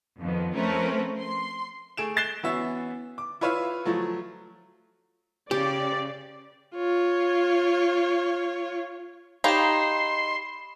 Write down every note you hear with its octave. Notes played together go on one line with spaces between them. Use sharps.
F2 D#3 B3
F3 A3 C4 C#4 A#4 B4
C6
A3 G#4 D7 E7
F#6 A6 C7 E7 G7
E3 B3 C#4 F#4 E5
D6
E4 F4 B4 C#5 E5 F5
F3 F#3 A3
C#3 G4 D5
F4 C#5
D#4 G4 C#5 F5 B5 C6 E7